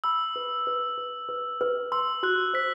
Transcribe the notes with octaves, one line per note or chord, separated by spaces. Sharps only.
B5 E6
B4
B4
B4
B4
B4
C6 E6
F#4 F#6
C5 B6